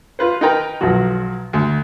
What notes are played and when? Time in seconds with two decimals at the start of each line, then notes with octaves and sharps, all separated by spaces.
0.19 F4 B4 C5
0.41 D#4 A#4 B4 G5 A#5
0.81 B1 F3 F#3 F#4
1.53 D2